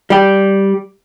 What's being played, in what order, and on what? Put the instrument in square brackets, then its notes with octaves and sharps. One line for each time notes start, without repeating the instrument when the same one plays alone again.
[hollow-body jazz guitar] G3 G4